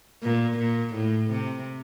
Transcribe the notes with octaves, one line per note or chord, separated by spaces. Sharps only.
A#2
A#2
A2
C3